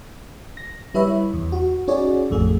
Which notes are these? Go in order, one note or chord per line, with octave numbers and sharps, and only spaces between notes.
A#6
G3 E4 B4 C#5 E5
E2
F#4
C#4 D#4 F#4 G#4 C#5 D5
A1 F2 A3 G#4